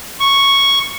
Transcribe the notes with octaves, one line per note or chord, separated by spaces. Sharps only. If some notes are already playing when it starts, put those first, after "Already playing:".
C#6